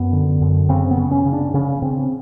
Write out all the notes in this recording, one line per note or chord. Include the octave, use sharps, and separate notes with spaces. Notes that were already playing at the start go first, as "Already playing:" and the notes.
Already playing: F#2 B3
D3
F#2
C#3 C4
B3
C#3
C#4
C#3
D4
C#3 C#4
C#3 C4